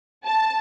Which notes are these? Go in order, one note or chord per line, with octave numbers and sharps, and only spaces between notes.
A5